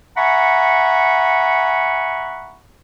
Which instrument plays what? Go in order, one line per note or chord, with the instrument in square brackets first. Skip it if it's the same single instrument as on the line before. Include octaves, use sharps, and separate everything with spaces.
[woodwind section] E5 F#5 G#5 A#5 B5 C#6